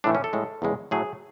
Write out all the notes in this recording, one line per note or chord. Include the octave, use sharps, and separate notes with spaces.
A2 E3 A3 D4
C#4
A4
A2 G#3
E2 C#3 G#3
A2 F#3 A3 G#4